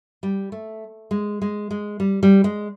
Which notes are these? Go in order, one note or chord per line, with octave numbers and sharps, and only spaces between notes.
G3
A3
G#3
G#3
G#3
G3
G3
G#3